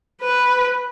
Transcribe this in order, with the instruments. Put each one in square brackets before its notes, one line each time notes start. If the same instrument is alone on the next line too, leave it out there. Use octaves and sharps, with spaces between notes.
[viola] B4